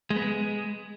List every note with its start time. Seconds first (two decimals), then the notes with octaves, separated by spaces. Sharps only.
0.10 G#3
0.16 B3
0.22 G#3